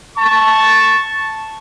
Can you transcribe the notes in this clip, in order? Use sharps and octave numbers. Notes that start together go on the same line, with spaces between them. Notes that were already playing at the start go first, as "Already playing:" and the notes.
A5 C#6